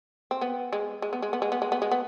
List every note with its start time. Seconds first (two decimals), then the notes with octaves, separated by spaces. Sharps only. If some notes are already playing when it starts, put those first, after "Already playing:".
0.31 C4
0.41 B3
0.73 G#3
1.02 G#3
1.13 B3
1.22 G#3
1.33 B3
1.42 G#3
1.52 B3
1.62 G#3
1.72 B3
1.82 G#3
1.92 B3